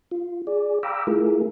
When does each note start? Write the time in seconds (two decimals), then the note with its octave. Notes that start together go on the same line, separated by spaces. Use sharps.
0.11 F4
0.47 G#4 D5
0.83 F5 G5 A#5 B5 D6 E6
1.07 A3 E4 F4 G#4 A#4